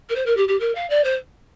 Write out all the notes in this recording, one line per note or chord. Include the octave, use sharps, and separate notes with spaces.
A#4
C5
A#4
G4
G4
A#4
F5
D5
C5